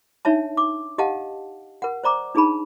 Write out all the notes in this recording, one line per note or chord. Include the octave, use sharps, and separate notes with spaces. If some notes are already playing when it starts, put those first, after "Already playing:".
D4 D#4 C#5 E5 A5
D6
G4 D#5 F5 F#5 A5
A#4 F#5
C5 D5 A#5 D6
D4 D#4 G#4 A5 B5